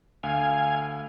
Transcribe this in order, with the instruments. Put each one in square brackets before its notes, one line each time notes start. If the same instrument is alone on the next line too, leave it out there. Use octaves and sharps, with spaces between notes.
[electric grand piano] D2 [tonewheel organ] F5 G#5